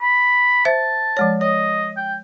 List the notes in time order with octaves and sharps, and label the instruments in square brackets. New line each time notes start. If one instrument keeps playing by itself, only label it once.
[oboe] B5
[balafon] C5 E5 [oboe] A5
[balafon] F3 G#3 C#5
[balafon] C#5 [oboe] D#5
[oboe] G5